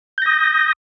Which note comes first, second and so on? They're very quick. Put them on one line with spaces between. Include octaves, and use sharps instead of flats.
G6 A#6 D#6